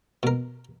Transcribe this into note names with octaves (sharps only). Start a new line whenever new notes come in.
B2 A#4